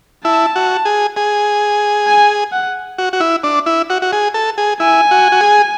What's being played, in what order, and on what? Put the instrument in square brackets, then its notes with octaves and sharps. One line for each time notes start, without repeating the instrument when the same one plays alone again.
[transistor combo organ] E4 [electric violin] A5
[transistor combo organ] F#4
G#4
G#4
[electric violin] G#5
F#5
[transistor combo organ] F#4
F#4
E4
D4
E4
F#4
F#4
G#4
A4
G#4
[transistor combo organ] E4 [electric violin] G#5
[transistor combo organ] F#4
F#4
G#4